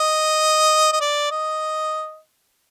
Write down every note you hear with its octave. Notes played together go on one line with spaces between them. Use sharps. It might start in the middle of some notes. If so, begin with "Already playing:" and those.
Already playing: D#5
D#5
D5
D#5